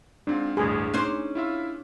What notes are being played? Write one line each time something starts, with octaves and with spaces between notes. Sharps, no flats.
G#2 C4 D4 F4
A1 D2 G2 G#4
C#4 D#4 C5 D6 F#6
E4 F4 E5